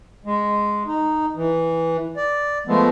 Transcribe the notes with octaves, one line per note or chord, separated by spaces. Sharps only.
G#3
D#4
E3
D5
F3 G#3 A3 B3